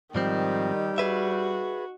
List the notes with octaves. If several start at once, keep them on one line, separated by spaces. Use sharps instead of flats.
G#2 D#3 F3 G3 C4
F#4 G#4 B4 E5